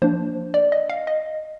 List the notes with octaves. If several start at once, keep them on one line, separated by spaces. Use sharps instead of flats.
F3 A#3 D4 C5
D5
D#5
F5
D#5